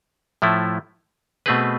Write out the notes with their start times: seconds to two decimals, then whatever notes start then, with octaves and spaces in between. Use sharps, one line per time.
0.42 A2 F3 A3 E4
1.46 B2 A3 C4 G#4 B4